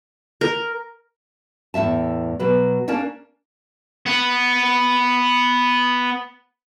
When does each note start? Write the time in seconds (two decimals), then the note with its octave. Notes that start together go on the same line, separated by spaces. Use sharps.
0.41 A#4
1.74 E2 A2 E5 A5
2.39 B2 F#3 B4
2.88 A#3 C#4 D4 A#4 A5
4.06 B3 F#5